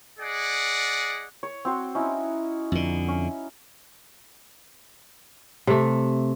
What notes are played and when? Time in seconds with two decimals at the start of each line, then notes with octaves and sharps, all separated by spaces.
0.19 G#4 D5 D#5 F#5
1.43 C#5
1.65 C4 F#4 C5
1.95 C#4 D#4 E4
2.72 F2 D3
3.08 C#4
5.67 C3 A3